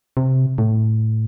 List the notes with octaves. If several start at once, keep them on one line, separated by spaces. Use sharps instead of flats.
C3
A2